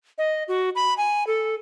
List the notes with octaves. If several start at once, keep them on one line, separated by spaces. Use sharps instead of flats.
D#5
F#4
B5
G#5
A4